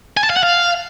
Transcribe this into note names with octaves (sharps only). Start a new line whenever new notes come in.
G#5
A5
F5
F#5
F5